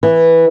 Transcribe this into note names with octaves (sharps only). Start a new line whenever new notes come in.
E3